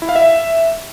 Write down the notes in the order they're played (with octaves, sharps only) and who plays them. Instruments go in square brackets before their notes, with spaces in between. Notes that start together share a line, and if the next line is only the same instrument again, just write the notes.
[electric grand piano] E4
F5
E5